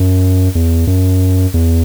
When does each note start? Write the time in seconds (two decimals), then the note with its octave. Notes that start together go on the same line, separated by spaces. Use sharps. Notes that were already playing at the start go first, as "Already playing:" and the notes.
Already playing: F#2
0.55 E2
0.87 F#2
1.54 E2